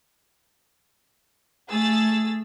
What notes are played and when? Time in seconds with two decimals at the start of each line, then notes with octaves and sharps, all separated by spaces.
1.70 A3 G#4 E6 A6